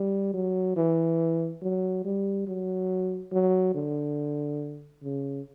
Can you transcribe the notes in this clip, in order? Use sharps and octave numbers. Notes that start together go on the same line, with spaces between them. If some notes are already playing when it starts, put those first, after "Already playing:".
Already playing: G3
F#3
E3
F#3
G3
F#3
F#3
D3
C#3